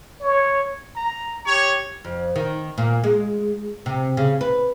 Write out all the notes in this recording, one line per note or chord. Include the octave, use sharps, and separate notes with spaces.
C#5
A#5
G4 C#5
F2
D#3
A#2
G#3
C3
C#3
B4